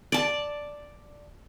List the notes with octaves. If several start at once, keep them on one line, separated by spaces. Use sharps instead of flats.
D5 A5